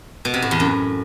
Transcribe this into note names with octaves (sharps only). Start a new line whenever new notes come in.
B2
C3
A2
E2
F#2